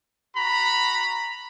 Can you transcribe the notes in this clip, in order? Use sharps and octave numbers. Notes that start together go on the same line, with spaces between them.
F#4 A#5 B5